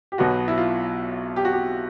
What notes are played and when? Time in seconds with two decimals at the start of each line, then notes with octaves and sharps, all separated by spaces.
0.12 G4
0.18 B1 B2 F#3 B3 F#4
0.48 E4
0.58 F4
1.36 G4
1.45 F#4
1.53 G4